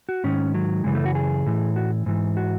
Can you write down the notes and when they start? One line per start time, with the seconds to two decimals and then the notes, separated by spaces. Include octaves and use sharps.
0.09 F#4
0.24 G#2 D#3 C#4
0.54 F#3
0.84 F#2 C#3 E3 G#3
0.95 A3
1.05 F#4
1.15 G#4
1.46 A2 E3
1.76 F#4
2.06 G#2 E3
2.37 F#4